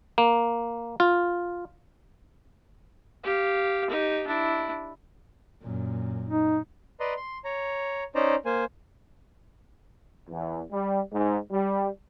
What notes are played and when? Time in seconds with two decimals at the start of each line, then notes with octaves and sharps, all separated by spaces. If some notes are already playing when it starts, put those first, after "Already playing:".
0.18 A#3
1.00 F4
3.24 G4 F5
3.90 D#4 G4
4.27 D4 E4
5.61 F#2 A#2
6.28 D#4
7.00 B4 D5 D#5 A#5 C6
7.17 C6
7.45 C#5 A#5
8.15 C#4 D#4 C5 D5 A#5
8.45 A#3 C5 G#5
10.29 E2
10.71 G3
11.11 G#2
11.51 G3